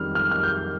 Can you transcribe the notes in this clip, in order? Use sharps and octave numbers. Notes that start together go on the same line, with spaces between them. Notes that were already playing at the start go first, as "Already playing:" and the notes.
Already playing: F2 D#3 G3 F6
F6
F6
G6